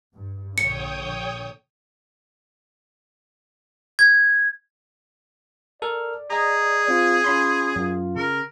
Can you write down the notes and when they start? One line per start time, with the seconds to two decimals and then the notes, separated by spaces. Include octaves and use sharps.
0.15 G2
0.58 A#1 D3 C#5 G5 D#6 C#7
3.99 G#6
5.82 A4 A#4 D5 F6
6.30 G#4 D#5 A#5
6.88 C4 F4
7.24 C#4 F4 B5 C6
7.76 F#2 F4
8.16 C#3 A#4